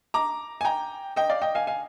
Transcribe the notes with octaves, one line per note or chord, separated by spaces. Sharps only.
A#5 D6
G#5
G5 A#5
D#5 G5
D5 F5
D#5 G5
F5 G#5
F5 G#5